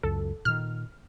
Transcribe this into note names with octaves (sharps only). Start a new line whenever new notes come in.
C#2 F#2 A4
A#2 D#3 F6